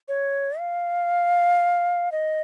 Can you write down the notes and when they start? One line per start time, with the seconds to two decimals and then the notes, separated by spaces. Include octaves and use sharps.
0.08 C#5
0.59 F5
2.12 D#5